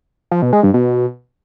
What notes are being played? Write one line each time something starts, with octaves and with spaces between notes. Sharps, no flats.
F3
B2
G#3
G2
B2